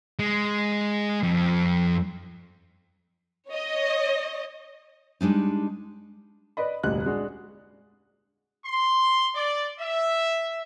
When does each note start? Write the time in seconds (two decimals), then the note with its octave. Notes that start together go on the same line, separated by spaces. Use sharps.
0.19 G#3
1.23 F2
3.51 C#5 D#5
5.21 G3 G#3 D4 D#4
6.57 B4 D5 D#5 B5
6.83 F1 D2 A#2 G3 D#5 F#6
7.06 G#3 D4 F#4
8.65 C6
9.35 D5
9.79 E5